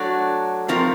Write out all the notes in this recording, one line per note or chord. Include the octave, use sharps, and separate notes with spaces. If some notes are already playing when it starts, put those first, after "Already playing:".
Already playing: F#3 A3 D4
F3 A3 C4 F4 A#4